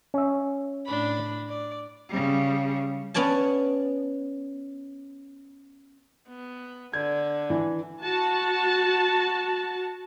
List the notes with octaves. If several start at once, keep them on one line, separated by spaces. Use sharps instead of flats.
C#4 E5
A2 D4 B5
D5
C#3 G3
B3 C#4 D5 G#5 A5
B3
D3 G#6
E3
F#4 A5